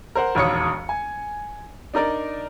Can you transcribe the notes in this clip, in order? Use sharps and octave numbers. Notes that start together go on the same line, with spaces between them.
A#4 C5 F#5
E1 A#1 D#2 C#5 D#6 C#7
G#5
D4 D#4 A#4 D5